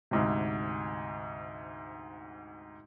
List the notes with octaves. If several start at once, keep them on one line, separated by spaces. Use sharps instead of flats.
D2 G#2 C3